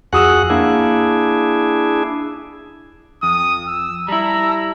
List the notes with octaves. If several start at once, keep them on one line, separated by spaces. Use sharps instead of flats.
F2 F#4 G#4 F#5 D#6 E6
A#3 D4 E4 G#4
F2 D#6
E6
G3 E4 A5 A#5 E6